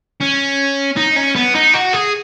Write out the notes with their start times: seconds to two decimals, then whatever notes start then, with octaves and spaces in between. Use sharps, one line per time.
0.20 C#4
0.97 D#4
1.16 C#4
1.36 B3
1.55 D#4
1.74 F#4
1.94 G#4